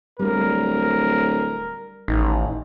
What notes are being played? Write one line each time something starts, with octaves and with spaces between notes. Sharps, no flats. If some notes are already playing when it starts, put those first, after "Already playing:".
D1 G3 A#4
A1 D#3